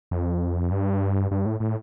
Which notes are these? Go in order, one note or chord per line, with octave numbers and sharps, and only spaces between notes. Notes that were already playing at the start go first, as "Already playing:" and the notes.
F2
G2
G2
A2
A2